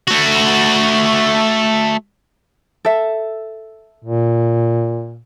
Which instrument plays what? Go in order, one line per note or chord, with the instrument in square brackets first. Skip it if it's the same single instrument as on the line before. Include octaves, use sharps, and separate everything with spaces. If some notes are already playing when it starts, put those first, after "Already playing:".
[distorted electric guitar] A3 F#4
[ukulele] A4 E5
[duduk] A#2